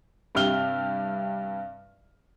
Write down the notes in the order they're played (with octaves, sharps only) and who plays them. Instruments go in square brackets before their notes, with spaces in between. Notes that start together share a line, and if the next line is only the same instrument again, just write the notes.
[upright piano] G2 C3 G4 E5 F6 G7